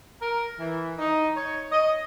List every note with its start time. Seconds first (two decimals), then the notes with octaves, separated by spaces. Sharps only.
0.22 A#4
0.60 E3
0.98 D#4
1.37 C#5
1.72 D#5